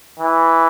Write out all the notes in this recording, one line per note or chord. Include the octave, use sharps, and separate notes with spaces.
E3